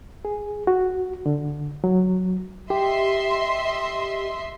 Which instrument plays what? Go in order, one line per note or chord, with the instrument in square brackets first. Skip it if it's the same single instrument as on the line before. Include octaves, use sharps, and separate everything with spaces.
[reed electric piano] G#4
F#4
D3
F#3
[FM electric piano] G4 [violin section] D#5 E5 C6